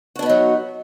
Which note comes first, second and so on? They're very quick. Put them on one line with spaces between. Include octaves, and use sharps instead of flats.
F#4 D4 B3 D#4 F#3